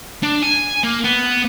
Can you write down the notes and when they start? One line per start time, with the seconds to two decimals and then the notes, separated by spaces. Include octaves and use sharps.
0.23 D4
0.42 G#5
0.83 A#3
1.04 B3